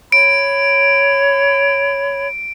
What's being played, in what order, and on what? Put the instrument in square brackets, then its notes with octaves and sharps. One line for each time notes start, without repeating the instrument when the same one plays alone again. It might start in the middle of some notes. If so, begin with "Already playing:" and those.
[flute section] C#5 B5 [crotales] D7